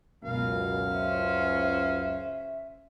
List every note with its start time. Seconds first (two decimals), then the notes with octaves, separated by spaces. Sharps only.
0.24 C#2 F#2 B2 A#4 F5
0.93 C#4 C5 E5